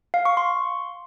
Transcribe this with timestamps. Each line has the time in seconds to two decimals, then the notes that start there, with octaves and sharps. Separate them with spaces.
0.14 F5
0.25 C#6
0.37 C6